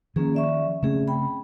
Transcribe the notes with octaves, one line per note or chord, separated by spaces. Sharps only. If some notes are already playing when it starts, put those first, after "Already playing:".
D#3 F3 A#3 C#4 G#4
D5 E5 C#6
C#3 A3 C4 C#4 G#4
G5 B5